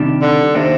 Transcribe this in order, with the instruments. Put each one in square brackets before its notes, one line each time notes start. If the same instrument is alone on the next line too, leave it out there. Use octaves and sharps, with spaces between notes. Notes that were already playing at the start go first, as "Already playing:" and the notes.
Already playing: [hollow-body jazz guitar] C3 D#3 G3 D4
[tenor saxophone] D3
[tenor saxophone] C3 [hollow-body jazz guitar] D#3 A#3 D4